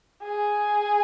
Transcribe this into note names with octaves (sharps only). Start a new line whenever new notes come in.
G#4